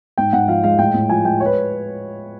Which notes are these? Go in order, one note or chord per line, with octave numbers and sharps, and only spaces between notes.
G#2 G5
G#2 F#5
F3 F5
G#3 F5
A2 G5
A2
F3 G#5
G#3 G5
C#5
B4